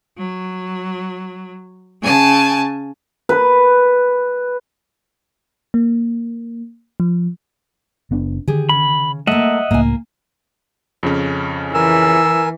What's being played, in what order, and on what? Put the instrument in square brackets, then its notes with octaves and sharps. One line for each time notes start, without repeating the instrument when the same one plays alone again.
[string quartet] F#3
C#3 G#5 A5
[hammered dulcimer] B4
[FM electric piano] A#3
F3
[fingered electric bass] F#1 B3 D4
[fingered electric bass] D3 D#3 [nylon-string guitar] G4 G#4
[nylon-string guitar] C#3 [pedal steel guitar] B5
[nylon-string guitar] A3 A#3 [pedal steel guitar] D#5 E5 F#5
[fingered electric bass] C#2 A2 [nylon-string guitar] A#3 G#5
[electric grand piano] F2 C#3 C#4
[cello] E3 [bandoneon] A#4 G#5 [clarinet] E6